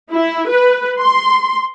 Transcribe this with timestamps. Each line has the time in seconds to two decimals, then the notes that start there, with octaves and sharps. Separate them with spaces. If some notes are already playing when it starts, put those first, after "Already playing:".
0.12 E4
0.50 B4
0.99 C6